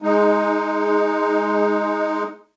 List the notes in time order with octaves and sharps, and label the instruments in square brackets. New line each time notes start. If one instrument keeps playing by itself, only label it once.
[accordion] G#3 D#4